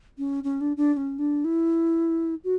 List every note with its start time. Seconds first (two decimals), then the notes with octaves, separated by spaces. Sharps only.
0.18 C#4
0.44 C#4
0.61 D4
0.77 D4
0.93 D4
0.96 C#4
1.18 D4
1.44 E4
2.44 F#4